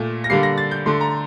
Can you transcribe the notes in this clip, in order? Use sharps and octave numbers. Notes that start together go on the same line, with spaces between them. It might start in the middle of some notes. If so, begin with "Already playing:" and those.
Already playing: A#2 A3
A#6
D3 G3 A#3 C7
A#6
A6
G6
D3 A3 C6
A#5